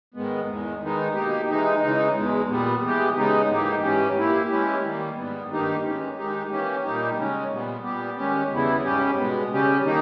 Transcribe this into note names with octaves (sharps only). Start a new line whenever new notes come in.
G#2 D#3 G#3 B3
E2 D#3 G#3
D#3 G#3 B3 D#4
B2 A#3 D#4 G4
E3 G#3 D#4
C#3 E3 G#3 D#4
E2 B2 G#3
A#2 G3 B3
E3 G#3 B3 G4
C#3 G#3 B3 D#4
G#2 E3 A#3 D#4 G4
G#2 E3 G3 C#4 G4
A#2 A#3 E4 G4
E3 G#3 C#4 E4 G4
D#3 G3 A#3
G#2 G3 B3
G2 D#3 A#3 D#4 G4
E3 G#3 C#4 G4
G#2 D#3 G#3 D#4 G4
E3 A#3 C#4 G4
A#2 G3 A#3 D#4 G4
C#3 G#3 C#4
A#2 G3 B3
A#2 G3 B3 G4
D#3 G#3 C#4 G4
E2 C#3 G3 B3 E4
G#2 G3 C#4 G4
B2 G#3 B3
C#3 G3 C#4 G4
D#3 A#3 D#4